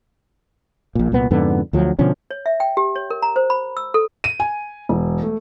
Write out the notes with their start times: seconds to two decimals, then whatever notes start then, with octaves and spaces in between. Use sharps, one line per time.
0.95 A#1 A#2
1.12 C2 A#2 B3
1.31 F2 G#2 D3 B3
1.73 D2 F3 F#3
1.99 B2 D3 F3 C#4
2.31 C#5
2.46 E5
2.60 G5
2.77 G4
2.96 C#5
3.10 A#4
3.22 A#5
3.36 C5
3.50 B5
3.77 E6
3.94 A4
4.24 D#7
4.40 G#5
4.89 E1
5.23 A3